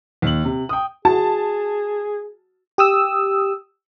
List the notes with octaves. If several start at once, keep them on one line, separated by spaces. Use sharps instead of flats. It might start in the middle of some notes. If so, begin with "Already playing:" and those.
D#2 F#7
C3
G5 D#6
F#4 G#4 A5
G4 D#6 E6